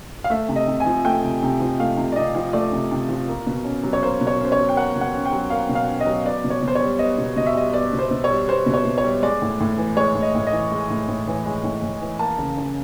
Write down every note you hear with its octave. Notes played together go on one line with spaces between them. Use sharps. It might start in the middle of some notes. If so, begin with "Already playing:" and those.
F5
A3 E5
C3
D#5
C3
G#5
F3
A3 G5
C3
C3
F3
A3 F5
C3
D5
C3 D#5
F3
A3 D5
C3
C3
F3
A#3
B2
C#4
F#3
C#5
A#3 C5
B2
C#5
C#4 C5
C#5
F#3
G5
A#3 F#5
B2
F#5
C#4
G5
F#3
A#3 F5
B2
F5
C#4
D#5
F#3
B3 D5
B2
C#5
B2
C5
C#5
G3
B3 D#5
B2
B2 D#5
E5
G3 D#5
B3 D5
B2
C5
B2
C#5
G3
B3 C5
B2
C#5
B2
C#5
G3
G#3 D5
A2
A2
E3
G#3 C#5
A2
D#5
A2
D#5
E3
G#3
A2
A2
E3
G#3
A2
A2
E3
A#3 A5
C#3
C#3